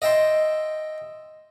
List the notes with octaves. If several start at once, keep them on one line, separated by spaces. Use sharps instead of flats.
D#5 E5 G5 A5 C6